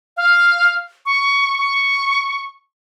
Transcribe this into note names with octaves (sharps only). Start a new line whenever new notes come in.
F5
C#6
C#6